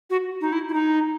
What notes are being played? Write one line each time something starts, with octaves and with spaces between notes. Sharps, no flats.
F#4
D#4
E4
E4
D#4